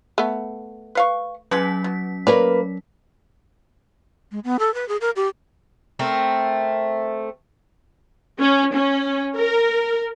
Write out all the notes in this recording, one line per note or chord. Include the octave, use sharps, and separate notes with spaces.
A3 B3
B4 F5 C#6
F#3 G#3 C#4 B4 B6
B2
A#3 A#4 B4 C#5 D5
G#3
B3
A4
B4
G#4
A#4
G4
A3 C4 A#4
C#4
C#4
A#4